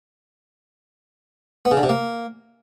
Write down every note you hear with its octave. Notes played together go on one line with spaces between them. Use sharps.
B3
C#3
D3
C3
A#3